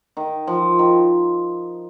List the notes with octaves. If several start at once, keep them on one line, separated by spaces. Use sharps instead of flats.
D#3
F3
D#3